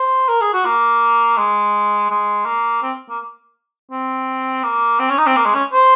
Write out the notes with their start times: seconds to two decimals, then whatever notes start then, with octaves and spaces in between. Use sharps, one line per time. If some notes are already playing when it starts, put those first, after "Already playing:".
Already playing: C5
0.29 A#4
0.41 G#4
0.53 F#4
0.65 A#3
1.38 G#3
2.10 G#3
2.46 A#3
2.82 C4
3.10 A#3
3.92 C4
4.64 A#3
4.99 C4
5.10 C#4
5.18 D#4
5.27 C4
5.36 A#3
5.46 G#3
5.55 C#4
5.73 C5